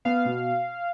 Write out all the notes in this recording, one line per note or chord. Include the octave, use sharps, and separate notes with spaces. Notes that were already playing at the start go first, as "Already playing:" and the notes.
B3 F5
B2